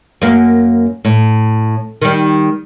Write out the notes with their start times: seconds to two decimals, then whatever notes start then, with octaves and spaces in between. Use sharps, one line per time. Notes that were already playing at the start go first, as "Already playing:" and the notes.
0.22 F#2 A#3
1.05 A2
2.02 D#3 G3